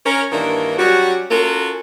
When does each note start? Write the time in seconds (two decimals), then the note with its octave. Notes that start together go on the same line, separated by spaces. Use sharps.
0.06 C#4 A#4
0.32 G2 D#3 E3 A#3 D4 A#4
0.78 F#3 G3 C#4 F#4
1.31 C#4 F4 F#4 A4 A#4